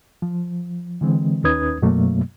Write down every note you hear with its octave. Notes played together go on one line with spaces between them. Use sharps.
F3
D3 E3 G#3 C4
D#2 C#4 D#4 B4 D#6 G#6
F#2 B2 F#3 A3 A#3